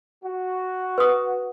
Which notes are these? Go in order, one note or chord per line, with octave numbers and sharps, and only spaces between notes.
F#4
B4 D#6